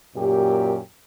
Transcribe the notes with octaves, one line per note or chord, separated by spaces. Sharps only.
F#2 A#2 G4